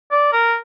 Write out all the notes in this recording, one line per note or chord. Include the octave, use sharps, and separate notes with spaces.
D5
A#4